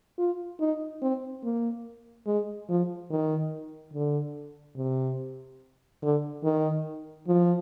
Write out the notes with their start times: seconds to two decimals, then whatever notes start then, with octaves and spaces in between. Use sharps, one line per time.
0.19 F4
0.60 D#4
1.02 C4
1.44 A#3
2.26 G#3
2.69 F3
3.11 D#3
3.94 D3
4.77 C3
6.02 D3
6.44 D#3
7.28 F3